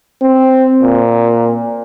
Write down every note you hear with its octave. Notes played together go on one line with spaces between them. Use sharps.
C4
A#2